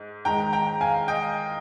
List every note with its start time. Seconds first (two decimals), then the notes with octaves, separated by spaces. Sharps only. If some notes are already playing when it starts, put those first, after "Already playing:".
Already playing: G#2
0.25 G#2 D#3 G#3 G5 A#5
0.53 G5 A#5
0.81 F5 G#5
1.08 D#5 G5